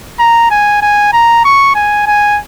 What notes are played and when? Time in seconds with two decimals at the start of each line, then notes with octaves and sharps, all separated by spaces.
0.19 A#5
0.51 G#5
0.82 G#5
1.13 A#5
1.44 C#6
1.75 G#5
2.07 G#5